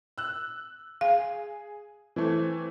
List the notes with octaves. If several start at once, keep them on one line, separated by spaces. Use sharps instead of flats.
E6 F#6
G#4 F5
E3 A3 C4